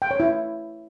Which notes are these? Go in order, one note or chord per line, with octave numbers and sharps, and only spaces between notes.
G5
C#5
E4